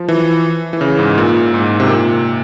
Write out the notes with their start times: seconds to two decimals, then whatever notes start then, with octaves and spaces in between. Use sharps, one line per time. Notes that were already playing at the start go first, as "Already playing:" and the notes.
Already playing: F3
0.08 E3
0.73 E3
0.81 C#3
0.99 G#2
1.18 A#2
1.54 G#2
1.80 C3
1.89 A#2